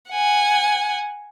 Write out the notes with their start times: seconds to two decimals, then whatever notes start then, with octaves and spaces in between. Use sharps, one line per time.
0.11 F#5 G#5